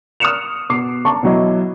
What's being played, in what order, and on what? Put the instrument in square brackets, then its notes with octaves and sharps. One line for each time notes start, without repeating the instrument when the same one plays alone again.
[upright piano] D#6 F6 F#6 C#7 E7 F7
B2 D6 C7
A5 A#5 C#6
B2 E3 F#3 E4 D#5